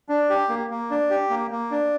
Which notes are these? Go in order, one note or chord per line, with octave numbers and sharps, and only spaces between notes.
D4
G4
A#3
A#3
D4
G4
A#3
A#3
D4